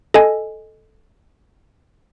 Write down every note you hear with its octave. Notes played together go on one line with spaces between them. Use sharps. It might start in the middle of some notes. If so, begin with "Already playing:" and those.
A4 D#5 G#5